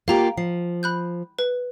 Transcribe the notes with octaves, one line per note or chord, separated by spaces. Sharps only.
A#3 F4 G4 F5 A#5
F3 C7
B5 F#6 G6
B4